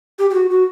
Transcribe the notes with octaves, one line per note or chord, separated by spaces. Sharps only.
G4
G4
F#4
F#4